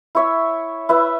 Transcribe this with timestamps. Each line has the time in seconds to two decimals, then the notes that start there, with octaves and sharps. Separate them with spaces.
0.15 E4 C#5 E5
0.89 E4 B4 E5